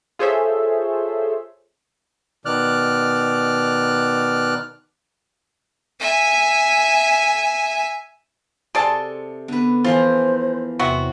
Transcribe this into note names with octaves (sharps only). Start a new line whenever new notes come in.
F4 G#4 A4 C5 C#5 E5
B2 D#3 D5 F6 F#6
E5 G#5
C3 G#4 A4 D5 A5 C6
D3 B3 B4
E3 F3 A#3 F4 G#4 C5
E2 C3 F#3 B3 C4 F#4 E5